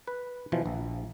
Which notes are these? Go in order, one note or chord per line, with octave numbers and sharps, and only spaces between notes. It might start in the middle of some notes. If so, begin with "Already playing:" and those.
B4
B2 E3 F3
A#1